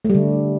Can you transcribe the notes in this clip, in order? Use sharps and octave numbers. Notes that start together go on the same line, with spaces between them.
A3
G3
D3